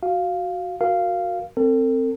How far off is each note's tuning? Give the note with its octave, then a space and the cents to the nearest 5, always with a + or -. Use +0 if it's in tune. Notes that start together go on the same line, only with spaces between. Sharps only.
F#4 +0 F5 +0
F#4 +0 A#4 +0 F5 -10
C4 +0 A4 +40